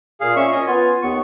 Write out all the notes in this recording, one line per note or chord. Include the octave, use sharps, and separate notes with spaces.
A#2 G#4 F5
C#4 E5 C#6
C#4 D#5
B3 F4 G#5
D#2 B3 C#6